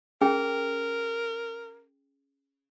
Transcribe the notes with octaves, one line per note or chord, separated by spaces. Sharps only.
C#4 G#4 A#4 G5